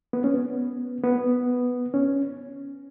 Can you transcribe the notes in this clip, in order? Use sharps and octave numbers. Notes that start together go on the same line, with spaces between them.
B3
C#4
B3
B3
C#4